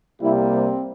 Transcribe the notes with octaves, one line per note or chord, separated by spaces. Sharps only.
C2 C3 G3 A#3 E4
C4